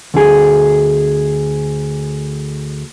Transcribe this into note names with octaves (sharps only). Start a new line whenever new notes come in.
D2 G#4